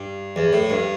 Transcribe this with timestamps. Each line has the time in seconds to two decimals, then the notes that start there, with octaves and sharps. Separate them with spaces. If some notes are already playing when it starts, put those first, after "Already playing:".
Already playing: G2
0.36 E2
0.53 A2
0.70 G2